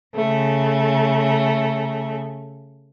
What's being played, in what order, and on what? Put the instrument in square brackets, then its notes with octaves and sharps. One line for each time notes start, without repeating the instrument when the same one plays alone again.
[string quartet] C#3 A3